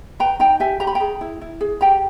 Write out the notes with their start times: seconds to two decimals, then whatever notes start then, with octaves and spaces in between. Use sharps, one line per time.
0.20 B4 G5 A#5
0.39 D#4 G5 A#5
0.60 G4 E5 G#5
0.80 G4 A#5
0.87 B5
0.95 G5 A#5
1.00 G#4
1.21 E4
1.41 E4
1.61 G#4
1.81 G4 G5 A#5